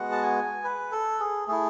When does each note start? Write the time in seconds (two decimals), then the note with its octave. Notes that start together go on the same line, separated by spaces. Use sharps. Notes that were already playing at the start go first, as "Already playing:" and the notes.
Already playing: G#3 B3 F#4 F#5
0.12 A5
0.23 G#5
0.64 B4
0.92 A4
1.20 G#4
1.48 A3 E4 G#4